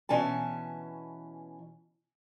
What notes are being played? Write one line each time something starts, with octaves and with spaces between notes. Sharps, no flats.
B2 E3 C#4 G#5 A5